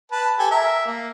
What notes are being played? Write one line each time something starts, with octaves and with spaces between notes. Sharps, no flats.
B4 A5
G4 A4 G#5
A#4 E5
A#3